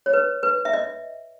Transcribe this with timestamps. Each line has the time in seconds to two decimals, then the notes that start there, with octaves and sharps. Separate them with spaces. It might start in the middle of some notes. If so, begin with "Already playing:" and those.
0.06 C#5
0.13 B4
0.43 B4
0.65 E5
0.73 D#5